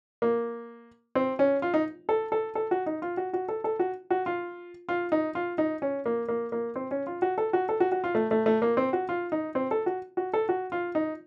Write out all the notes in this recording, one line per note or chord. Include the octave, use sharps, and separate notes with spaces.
A#3
C4
C#4
F4
D#4
A4
A4
A4
F#4
D#4
F4
F#4
F#4
A4
A4
F#4
F#4
F4
F4
D#4
F4
D#4
C#4
A#3
A#3
A#3
C4
C#4
F4
F#4
A4
F#4
A4
F#4
F#4
F4
A3
A3
A3
A#3
C4
F#4
F4
D#4
C4
A4
F#4
F#4
A4
F#4
F4
D#4